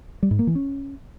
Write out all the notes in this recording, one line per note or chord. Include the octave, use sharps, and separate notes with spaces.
G3
G#2
A#3
E3
C#4